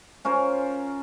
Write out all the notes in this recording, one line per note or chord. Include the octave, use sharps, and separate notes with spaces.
C#4 F4 A#4 C5